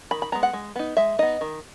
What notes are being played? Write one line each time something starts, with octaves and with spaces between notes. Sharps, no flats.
D#3 B5
B5
G#3 B3 A#5
F#5
G#3
B3 D#4
G#3 E5
B3 D#4 D#5
D#3